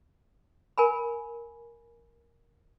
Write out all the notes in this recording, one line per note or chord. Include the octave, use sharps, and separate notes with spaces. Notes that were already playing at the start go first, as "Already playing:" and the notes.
A#4 G#5 B5